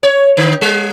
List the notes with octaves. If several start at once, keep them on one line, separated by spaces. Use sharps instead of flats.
C#5
D3
G3